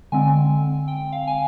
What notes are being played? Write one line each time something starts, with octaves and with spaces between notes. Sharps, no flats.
D3 G#3 C4 G#5
G5
F5
G#5